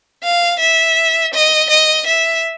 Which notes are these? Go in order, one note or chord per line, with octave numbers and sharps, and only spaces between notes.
F5
E5
D#5
D#5
E5